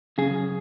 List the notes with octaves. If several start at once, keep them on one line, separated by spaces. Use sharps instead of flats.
F#2 C#3 G#4